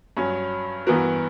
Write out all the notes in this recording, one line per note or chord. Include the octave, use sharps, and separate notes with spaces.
G2 F#3 C#4
G2 E3 B3 F#4 A#4